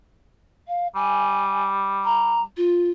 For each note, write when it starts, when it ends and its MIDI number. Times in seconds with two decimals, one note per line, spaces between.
0.68 0.87 77
0.95 2.46 55
0.95 1.64 80
2.04 2.41 82
2.57 2.90 65